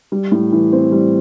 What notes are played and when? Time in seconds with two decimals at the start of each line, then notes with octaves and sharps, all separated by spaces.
0.12 G3
0.32 A2
0.52 E3
0.73 C4
0.92 G3